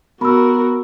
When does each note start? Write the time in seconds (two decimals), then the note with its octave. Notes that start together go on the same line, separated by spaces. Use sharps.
0.21 B3 F#4 A#4 A#5 B5 E6